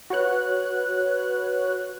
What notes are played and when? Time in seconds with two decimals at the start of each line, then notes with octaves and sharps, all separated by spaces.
0.10 F#4 B4 C#5 F#6